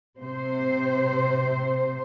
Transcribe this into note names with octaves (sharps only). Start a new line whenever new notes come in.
C3 C5